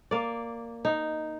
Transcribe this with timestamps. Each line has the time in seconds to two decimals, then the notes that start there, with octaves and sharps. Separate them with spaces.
0.11 A#3 D5
0.85 D#4